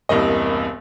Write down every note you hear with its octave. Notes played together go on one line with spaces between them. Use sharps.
E1 C2 G2 A#3 D#5